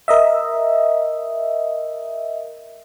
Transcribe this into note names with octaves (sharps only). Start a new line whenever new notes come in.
A#4 D#5 E5